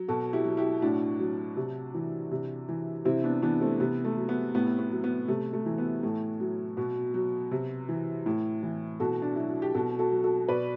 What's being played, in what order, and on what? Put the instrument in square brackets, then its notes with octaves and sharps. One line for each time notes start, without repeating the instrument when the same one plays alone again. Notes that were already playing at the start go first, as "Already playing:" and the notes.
Already playing: [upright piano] F#3
B2 F#4 A4
E4 G4
F#3
E4 G4
A2 D4 F#4
F#3
C3
E3
C3
E3
C3 C4 E4
B3 D4
E3 B3 D4
A3 C4
C3 B3
A3
F#3
B3
A2 B3
B3
F#3
B3
C3 A3
A3
E3
B3
A2 A3
F#3
B2 B3
F#3
C3
E3
A2
E3
B2 F#4 A4
D4
F#3 E4
F#4
G4
B2 F#4 A4
F#4 A4
F#3
F#4 A4
B2 B4 D5